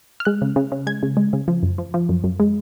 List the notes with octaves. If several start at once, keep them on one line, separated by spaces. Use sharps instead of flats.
F6
G#3 F#6
C#3
C#3
C#3
G#3 G#6
C#3
G#3
C#3
F3
F#2
F3
F3
F#2
F#2
G#3